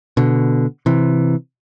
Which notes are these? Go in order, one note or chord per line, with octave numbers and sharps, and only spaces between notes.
B2 D3
C3 E3